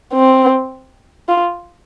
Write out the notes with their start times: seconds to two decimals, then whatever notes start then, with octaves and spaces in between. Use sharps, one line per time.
0.13 C4
1.29 F4